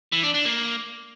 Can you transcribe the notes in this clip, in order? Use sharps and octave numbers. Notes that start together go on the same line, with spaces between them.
E3
D4
D4
A#3